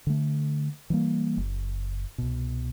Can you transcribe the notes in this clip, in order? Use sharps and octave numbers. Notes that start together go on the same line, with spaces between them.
D3 A3
E3 G3 A#3
F#1
C2 B2